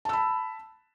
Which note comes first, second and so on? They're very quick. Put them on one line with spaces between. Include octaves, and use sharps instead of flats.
A5 E6 B5